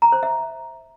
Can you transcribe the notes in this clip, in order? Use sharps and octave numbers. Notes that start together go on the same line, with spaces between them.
A#5
C5
E5